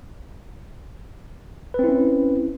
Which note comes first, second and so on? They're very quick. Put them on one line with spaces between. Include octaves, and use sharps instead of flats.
B4 C4 E4 C#4